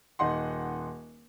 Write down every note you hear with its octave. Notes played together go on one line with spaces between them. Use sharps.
D#1 D#4 F#5 C6